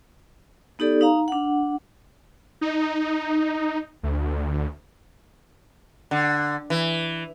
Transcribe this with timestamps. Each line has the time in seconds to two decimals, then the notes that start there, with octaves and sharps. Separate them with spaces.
0.79 B3 D#4 G4 A4 D5
1.01 D#4 F5 A#5
1.28 D4 F#5
2.61 D#4
4.03 D2
6.11 D3
6.70 E3